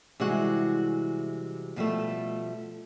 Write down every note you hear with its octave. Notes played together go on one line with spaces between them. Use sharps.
C3 E3 G3 G#3 F#4 F#5
B2 F3 G3 A3